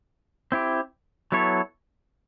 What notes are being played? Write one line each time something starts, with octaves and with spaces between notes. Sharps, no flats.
C4 E4 G4
F#3 B3 E4 A4 C#5